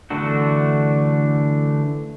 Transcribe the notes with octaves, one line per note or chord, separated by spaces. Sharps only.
D3 E3 A3 D4 F#4